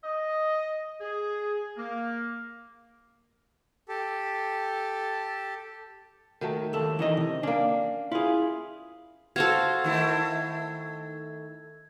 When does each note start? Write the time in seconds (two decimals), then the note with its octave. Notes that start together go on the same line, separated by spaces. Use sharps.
0.04 D#5
1.01 G#4
1.77 A#3
3.89 G4 A4
6.41 D#3 F#3 A3
6.73 D#2 A4
6.99 E3 D#4 D#5
7.17 C3
7.43 A#3 C#4 D4
8.12 E4 F4 G#4
9.36 F#4 A4 C5 F5 G#6
9.84 D#3 A3 E4